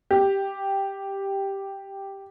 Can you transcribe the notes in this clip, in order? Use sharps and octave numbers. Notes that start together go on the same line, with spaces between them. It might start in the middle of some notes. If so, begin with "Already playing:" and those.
G4